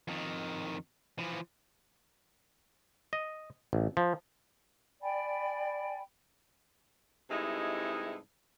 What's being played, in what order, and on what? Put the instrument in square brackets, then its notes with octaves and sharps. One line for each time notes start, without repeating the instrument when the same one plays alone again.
[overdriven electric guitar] F2 D#3
E3 F3
[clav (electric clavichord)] D#5
A1
F3
[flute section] D5 G5 G#5 B5
[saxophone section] G2 C3 G#3 A3 D#4 E4